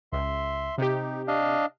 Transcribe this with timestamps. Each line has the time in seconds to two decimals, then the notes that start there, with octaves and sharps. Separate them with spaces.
0.13 C#2 E5 C6
0.78 C3 D#4 G4
1.28 D4 D#5 F5